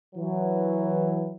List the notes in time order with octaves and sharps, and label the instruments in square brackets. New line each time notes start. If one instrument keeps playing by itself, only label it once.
[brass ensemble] E3 F#3